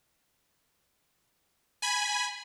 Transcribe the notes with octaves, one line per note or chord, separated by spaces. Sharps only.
G#5 B5